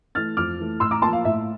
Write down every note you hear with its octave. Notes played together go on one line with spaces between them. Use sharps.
E3 A3 F6 A6
F2 D6 F6
E3 A3
A2 C6 E6
A#5 D6
F3 A#3 A5 C6
F5
A2 E5